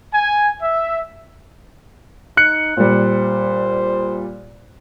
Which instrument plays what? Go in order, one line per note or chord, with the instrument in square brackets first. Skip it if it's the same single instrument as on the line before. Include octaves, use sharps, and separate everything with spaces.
[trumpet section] G#5
E5
[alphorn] D#4 [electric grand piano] F#6 C#7
[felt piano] A#2 G3 [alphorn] C5